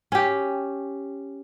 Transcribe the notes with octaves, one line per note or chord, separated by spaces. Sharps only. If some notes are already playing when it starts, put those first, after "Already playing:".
C#4 G4